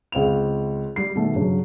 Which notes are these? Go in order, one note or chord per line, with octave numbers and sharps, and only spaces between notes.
C#2 C4 F5 F7
G3 C7
B2 D#3 A3
G2 C#3 F#3